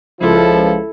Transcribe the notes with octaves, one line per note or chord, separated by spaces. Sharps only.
C#2 F3 E4 A4